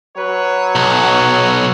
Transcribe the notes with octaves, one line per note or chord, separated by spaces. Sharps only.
F#3 B4 C#5
B1